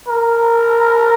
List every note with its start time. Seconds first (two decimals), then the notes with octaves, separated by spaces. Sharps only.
0.08 A#4